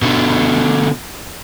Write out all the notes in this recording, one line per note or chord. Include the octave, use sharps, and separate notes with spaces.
B2 D3